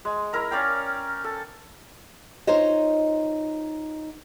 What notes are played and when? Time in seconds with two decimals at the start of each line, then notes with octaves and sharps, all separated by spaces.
0.05 G#3
0.33 E4 A#4 A#5
0.51 C#4 D5 F5 G5
1.24 A4
2.47 D#4 F4 A#4 C5 C#5 D#5